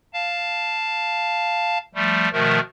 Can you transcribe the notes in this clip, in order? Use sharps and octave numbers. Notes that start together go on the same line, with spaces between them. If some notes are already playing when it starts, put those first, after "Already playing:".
F5 A5
F3 G3 A3
B2 D#3 F3 A3 A#4